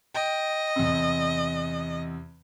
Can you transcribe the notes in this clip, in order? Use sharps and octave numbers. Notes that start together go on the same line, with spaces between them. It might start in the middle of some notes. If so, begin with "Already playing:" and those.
D#5 G5
E2 C3